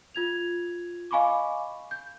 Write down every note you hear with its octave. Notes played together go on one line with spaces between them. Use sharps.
F4 G#6 F7
D#5 F5 G#5 B5 C#6 D6
G6